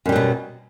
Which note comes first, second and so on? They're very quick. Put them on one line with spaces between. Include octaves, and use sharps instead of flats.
F#2 G3 F#3 B2